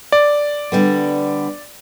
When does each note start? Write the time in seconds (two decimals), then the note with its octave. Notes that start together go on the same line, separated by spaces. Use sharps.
0.12 D5
0.72 D3 G3 B3